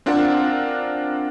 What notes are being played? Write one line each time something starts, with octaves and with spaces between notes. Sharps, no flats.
C4 D4 F4 A#4 F#5